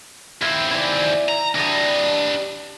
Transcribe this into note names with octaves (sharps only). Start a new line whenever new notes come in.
D#2 C4 E4
E4 D5 G#5
A#5
E3 G3 D4 D#5